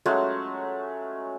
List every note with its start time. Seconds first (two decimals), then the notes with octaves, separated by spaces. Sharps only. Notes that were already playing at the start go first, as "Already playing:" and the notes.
0.06 F#3 G#3 A3 C#4